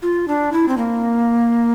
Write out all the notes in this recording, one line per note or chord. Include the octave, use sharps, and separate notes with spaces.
F4
D4
E4
C4
A#3